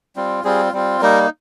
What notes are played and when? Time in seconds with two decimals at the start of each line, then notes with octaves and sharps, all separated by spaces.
0.16 G3 C4 F4
0.44 G3 C4 F4 G#4
0.73 G3 C4 F4
1.01 G3 A#3 D#4 A#4